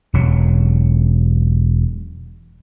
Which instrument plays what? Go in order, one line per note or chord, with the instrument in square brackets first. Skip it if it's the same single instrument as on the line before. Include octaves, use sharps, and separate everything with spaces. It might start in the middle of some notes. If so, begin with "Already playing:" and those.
[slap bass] E1 F#3